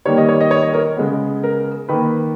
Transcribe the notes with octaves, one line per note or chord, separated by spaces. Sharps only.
D#3 G3 A#3 C#5
D#5
C#5
D#5
C#5
D#5
A#4 C#5
C#3 G#3 B3
A#4
D#3 A#3 B4